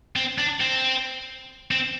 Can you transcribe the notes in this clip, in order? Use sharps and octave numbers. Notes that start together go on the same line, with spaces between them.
C4
D4
C4
C4